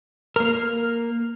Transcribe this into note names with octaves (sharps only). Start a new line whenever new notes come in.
A#3 A#4